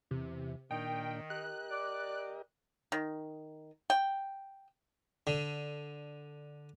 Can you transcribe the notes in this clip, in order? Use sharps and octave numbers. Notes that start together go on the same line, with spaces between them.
E2 C3
A#2 D#3 D4 G5
G4 A#4 D#5 F#6
D5
D#3
G5
D3